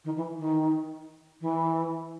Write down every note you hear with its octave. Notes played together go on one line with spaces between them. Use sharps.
D#3
E3
D#3
E3